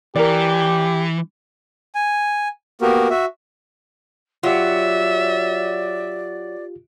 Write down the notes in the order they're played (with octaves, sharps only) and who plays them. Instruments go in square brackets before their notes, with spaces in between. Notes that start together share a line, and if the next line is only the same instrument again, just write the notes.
[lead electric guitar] E3 [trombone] G4 [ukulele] A#4 D5
[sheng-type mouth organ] G#5
A#3 B3 F#4 G4 A#4
F#4 E5
[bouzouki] F#3 [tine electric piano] F4 G4 [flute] D5 [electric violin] E5